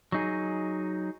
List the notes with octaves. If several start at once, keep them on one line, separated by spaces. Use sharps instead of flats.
F#3 D#4 G#4